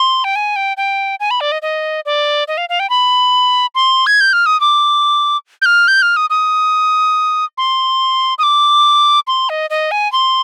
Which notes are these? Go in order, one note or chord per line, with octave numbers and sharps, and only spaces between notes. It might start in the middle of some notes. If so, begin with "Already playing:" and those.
Already playing: C6
G5
G#5
G5
G5
G#5
B5
D5
D#5
D#5
D5
D#5
F5
F5
G5
B5
C6
G#6
G6
F6
D#6
D6
G6
F6
G6
F6
D#6
D#6
C6
D#6
D6
C6
D#5
D#5
G#5
C6